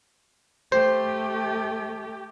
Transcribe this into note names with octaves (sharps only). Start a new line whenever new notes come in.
A3 G4 C5